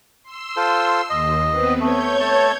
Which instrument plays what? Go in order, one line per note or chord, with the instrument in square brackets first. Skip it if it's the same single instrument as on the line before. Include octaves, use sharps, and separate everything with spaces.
[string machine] C6 E6
[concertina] F4 A4 C5
[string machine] D#2 [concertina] D#5
[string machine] B3 C4 B4
[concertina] A3 [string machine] C#5 G6 G#6
[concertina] A3 A5